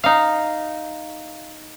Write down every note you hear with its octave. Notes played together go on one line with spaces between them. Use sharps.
D#4 F5